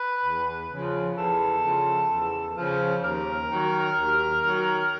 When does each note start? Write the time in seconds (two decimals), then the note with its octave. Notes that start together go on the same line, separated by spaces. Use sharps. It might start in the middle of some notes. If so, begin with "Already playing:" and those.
Already playing: B4
0.25 E2
0.72 C#3 F3
1.18 E2 A4
1.64 C#3 F3
2.11 E2
2.57 C#3 F3
3.03 D#2 A#4
3.49 D#3 F#3
3.96 D#2
4.42 D#3 F#3